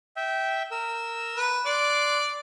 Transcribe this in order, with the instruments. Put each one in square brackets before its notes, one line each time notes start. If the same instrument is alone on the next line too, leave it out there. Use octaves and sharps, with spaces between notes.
[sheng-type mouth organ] E5 G5
A#4 E6
[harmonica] B4
[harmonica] D5 [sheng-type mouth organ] C6 D6 F#6